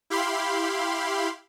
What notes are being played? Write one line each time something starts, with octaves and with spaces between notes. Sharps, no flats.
E4 G4 F5 B5 C6